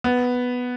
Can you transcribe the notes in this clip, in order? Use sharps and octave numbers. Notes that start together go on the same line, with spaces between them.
B3